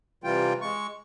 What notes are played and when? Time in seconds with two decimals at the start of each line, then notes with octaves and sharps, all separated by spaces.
0.24 C3 E3 G3 F4 G5
0.61 G#3 C#6